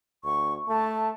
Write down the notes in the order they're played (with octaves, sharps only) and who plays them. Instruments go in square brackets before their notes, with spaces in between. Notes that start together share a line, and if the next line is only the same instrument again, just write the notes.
[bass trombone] D2 [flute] C#6
[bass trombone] A3 [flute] A5